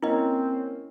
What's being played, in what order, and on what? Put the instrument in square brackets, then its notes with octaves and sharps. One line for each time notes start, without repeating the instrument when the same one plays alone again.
[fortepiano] A#3 [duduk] C4 [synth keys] C#4 [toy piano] E4 D#5